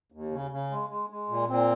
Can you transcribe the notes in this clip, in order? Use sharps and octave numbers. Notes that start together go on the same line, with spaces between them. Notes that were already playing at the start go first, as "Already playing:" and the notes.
D#2
C#3
C#3
G#3
G#3
G#3
A#2
A#2 C4